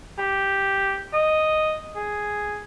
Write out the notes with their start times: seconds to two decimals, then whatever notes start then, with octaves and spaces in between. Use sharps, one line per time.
0.18 G4
1.13 D#5
1.95 G#4